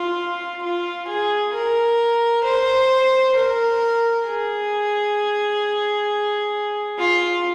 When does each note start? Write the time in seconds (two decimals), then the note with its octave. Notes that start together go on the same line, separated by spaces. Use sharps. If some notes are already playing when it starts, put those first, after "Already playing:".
Already playing: F4
0.62 F4
1.08 G#4
1.53 A#4
2.44 C5
3.35 A#4
4.25 G#4
6.98 F4